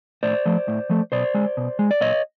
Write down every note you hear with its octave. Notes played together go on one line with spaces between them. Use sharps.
A2 C5 D5
F3 A3
A2
F3 A3
B2 C5 D5
G#3
B2
G#3
D5
A#2 C#5 D#5